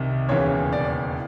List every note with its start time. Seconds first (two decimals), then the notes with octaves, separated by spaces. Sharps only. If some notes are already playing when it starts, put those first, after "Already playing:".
Already playing: C2 C3 D#3
0.29 E1 D#2 C#3 E3 C#5
0.73 D5